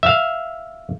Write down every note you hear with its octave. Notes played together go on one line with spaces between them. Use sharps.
E5 F5